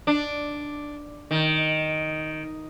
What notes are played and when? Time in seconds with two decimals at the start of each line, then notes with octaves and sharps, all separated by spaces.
0.07 D4
1.31 D#3